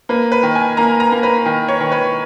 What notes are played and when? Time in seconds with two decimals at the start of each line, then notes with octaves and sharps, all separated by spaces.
0.09 A#3 B4
0.32 B4
0.43 D#3
0.55 G#5
0.77 A#3 A#5
1.00 A#5
1.12 A#3
1.23 B4
1.46 D#3
1.68 C#5
1.81 D#3
1.92 B4